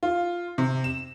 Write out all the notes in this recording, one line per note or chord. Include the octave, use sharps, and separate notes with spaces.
F4
C3
E7